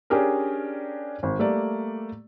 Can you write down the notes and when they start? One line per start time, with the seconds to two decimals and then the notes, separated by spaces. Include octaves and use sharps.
0.10 C#4 D4 G4 G#4 A#4
1.23 G#1
1.39 G3 A3 A#3 D5